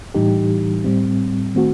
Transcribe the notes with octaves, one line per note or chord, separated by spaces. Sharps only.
A2 E3 G3 D#4 G4
A2 G3 C4
D#3 A3 C4 F#4